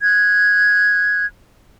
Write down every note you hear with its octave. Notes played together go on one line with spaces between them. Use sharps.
F#6 G#6